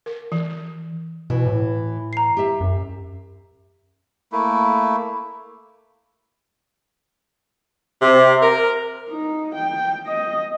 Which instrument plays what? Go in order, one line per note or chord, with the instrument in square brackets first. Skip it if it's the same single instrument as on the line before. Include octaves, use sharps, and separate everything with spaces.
[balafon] A#4
E3
[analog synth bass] B2 [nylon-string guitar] E3
[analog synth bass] A2
[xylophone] A#5 C7
[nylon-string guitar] G4 E5
[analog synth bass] F#2
[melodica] A3 A#3 E4
[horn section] C3
A#4
[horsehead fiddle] D#4
G5
D#5